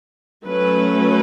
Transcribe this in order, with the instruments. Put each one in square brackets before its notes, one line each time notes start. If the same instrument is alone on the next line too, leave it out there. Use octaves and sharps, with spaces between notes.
[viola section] F#3 A3 C#4 B4